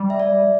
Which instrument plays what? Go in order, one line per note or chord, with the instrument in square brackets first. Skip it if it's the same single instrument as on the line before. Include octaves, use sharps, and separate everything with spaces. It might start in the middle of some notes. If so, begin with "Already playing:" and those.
Already playing: [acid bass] G3
[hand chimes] E5
D5